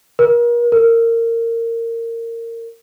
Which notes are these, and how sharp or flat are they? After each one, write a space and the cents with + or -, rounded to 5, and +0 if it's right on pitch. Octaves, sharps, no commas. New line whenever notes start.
A#4 +35
A#4 -20